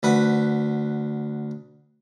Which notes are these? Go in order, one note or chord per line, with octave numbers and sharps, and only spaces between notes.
D2 B4 F#5